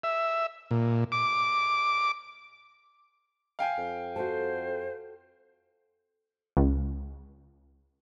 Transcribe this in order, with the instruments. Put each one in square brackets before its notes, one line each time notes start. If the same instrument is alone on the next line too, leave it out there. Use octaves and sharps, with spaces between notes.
[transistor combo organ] E5
A#2
D6
[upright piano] F5 G5 G#5
[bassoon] F2
[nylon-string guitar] F#4 A4 [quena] C5
[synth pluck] C#2